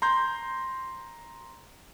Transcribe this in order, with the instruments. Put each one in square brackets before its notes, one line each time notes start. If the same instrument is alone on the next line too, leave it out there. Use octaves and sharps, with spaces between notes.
[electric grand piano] A#5 C6 G6